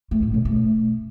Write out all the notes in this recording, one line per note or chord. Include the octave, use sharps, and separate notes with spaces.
A3
A2
B2
A3